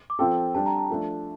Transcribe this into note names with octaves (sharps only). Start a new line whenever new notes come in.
D6
F3 C4 F4 A4 G5
G3 D4 G4 A5
A#5
A5
F3 A3 D4